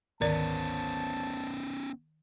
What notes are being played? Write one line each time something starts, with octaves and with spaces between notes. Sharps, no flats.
G#1 D2 D#3 B3 C#4 D5 A5